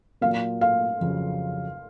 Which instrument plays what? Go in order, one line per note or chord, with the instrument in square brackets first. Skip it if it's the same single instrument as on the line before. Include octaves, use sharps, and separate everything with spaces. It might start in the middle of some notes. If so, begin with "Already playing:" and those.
[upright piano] A#2 F#3 A#3 [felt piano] F5
[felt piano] F5
[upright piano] F2 C#3 F#3